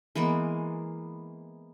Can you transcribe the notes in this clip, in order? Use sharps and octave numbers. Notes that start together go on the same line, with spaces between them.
E3 G#3 A#3 B3